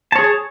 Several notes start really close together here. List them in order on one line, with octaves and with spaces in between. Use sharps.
A5 C#5 G#4